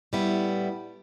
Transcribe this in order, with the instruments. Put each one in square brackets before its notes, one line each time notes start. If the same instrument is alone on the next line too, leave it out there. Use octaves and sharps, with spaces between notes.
[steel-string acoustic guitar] A2 G3 B3 E4